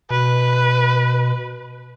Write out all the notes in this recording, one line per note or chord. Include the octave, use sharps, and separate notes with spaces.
B2 B4